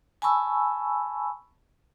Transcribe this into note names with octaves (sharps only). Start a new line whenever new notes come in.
G#5 A5 B5 C#6 E6